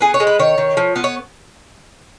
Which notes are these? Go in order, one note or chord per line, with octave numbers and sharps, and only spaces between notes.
B3 G#4
C#5
G#3
B4
D#3 C#5
D#3
F3
B3
C#5